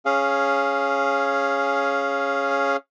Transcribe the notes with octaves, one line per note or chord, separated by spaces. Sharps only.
C#4 G#4 F5